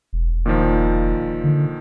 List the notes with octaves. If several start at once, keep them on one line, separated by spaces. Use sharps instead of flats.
E1
A#2 D#3 F3
D3